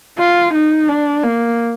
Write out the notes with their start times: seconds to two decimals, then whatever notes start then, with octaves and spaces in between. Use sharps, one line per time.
0.19 F4
0.54 D#4
0.88 D4
1.24 A#3